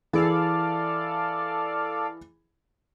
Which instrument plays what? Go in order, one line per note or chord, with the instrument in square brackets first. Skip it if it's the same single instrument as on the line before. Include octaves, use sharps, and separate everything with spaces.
[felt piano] E3 G#4 [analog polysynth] A4 D5 F5